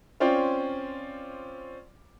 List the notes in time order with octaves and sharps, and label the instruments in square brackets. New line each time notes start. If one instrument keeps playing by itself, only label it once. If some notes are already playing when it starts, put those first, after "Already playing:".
[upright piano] C4 C#4 F4 D5 G5